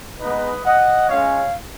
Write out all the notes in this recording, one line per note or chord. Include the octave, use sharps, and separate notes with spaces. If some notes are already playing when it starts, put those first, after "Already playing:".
G#3 B3 D#4 B4 D#5
D#5 F#5
G#3 C#4 F4 C#5 F5